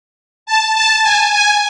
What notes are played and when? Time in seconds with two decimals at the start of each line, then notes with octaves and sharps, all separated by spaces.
0.46 A5
0.75 A5
1.03 G#5
1.32 G#5